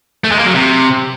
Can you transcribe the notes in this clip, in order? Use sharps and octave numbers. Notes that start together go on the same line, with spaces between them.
A3
G#3
A#3
F#3
C3